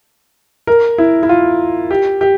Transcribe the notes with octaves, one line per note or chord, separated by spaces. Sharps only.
A#4
E4
E4
F4
G4
G4